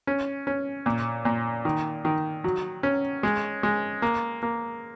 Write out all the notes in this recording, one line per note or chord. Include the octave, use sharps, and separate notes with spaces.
C#4
C#4
A#2
A#2
D#3
D#3
F#3
C#4
G#3
G#3
A#3
A#3